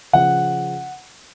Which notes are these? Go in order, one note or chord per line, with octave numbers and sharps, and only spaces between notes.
C#3 F3 F#5